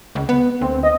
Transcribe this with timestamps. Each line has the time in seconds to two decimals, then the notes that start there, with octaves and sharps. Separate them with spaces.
0.15 C#2
0.29 B3
0.61 D2 C4
0.83 D#5